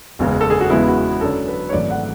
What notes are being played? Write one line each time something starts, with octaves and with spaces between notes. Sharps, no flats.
F#1 E2 C#3 G#3
A4
G#4
F#4
E2 C#3 G#3 B3 E4
F#4
F#2 D3 F#3 C#4 A4
B4
C#5
G#1 F#2 E3 A3 D5
F#5